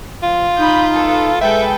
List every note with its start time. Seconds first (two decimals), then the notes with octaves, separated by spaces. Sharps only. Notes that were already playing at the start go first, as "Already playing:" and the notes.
0.23 F3 F4
0.58 D#4 B5 D#6 G6
0.94 A4 B4
1.41 G#3 A4 B4 E5 G5